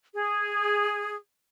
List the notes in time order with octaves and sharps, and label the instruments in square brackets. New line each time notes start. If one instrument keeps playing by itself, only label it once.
[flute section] G#4